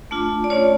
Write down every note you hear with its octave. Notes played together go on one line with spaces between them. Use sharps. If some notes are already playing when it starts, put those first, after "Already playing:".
A3 D4 F4
D5
A3 C#4 F4 C#5